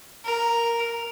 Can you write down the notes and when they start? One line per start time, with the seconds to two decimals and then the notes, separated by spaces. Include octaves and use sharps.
0.25 A#4